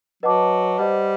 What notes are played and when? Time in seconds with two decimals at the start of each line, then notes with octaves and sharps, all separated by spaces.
0.23 F#3 B4 D#5 F#5 A5 D6
0.78 G3 C5 D#5 F#5